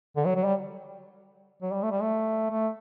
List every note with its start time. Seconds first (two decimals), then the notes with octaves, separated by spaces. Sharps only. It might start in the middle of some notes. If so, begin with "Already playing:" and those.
0.16 D3
0.25 F#3
0.36 F#3
0.45 G3
1.62 F#3
1.72 G3
1.83 A3
1.91 G3
2.01 A3
2.51 A3